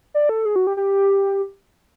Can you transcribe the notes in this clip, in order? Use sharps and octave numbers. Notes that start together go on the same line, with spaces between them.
D5
A4
G#4
F#4
G4
G4